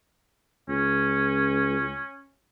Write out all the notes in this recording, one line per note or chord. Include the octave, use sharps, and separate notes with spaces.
C#2 C#4